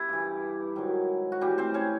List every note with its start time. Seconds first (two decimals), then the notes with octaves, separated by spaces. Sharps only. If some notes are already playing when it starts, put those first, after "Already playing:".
Already playing: E4 G4
0.09 G2 E3
0.76 G#2 D#3 F#3
1.32 F#4
1.41 A2 E3 G3 G4
1.58 C4 C5
1.74 C#4 C#5